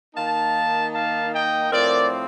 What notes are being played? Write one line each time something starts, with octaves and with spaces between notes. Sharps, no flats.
D#3 A#3 D#4 F5 A5
F5 A5
D#5 G5
A2 F3 C4 A#4 D5